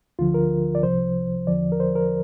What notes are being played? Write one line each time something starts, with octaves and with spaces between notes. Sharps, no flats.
D2 D3 F3 F4
A#4
D5
C2 C3 F3 C5
E2 D3 F3 D5
A#4
C5
A#4